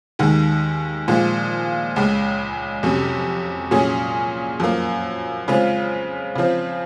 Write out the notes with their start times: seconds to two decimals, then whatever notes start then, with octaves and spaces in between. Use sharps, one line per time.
0.19 D#2 D#3 G#3
1.08 A#2 F3 G#3
1.96 C#2 C#3 G#3
2.83 F2 C3 F#3 C#4
3.71 A#2 F#3 C#4 G#4
4.60 F#2 F3 A#3
5.48 C#3 G#3 C4 F4
6.35 C#3 F3 C4